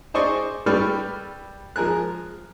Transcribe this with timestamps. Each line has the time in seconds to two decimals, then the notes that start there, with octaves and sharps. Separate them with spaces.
0.14 G#4 C5 D5 D#5 C#6
0.66 G3 A4 B4 G5 C#6 F6
1.76 F3 G#3 A#4 G#5 F#6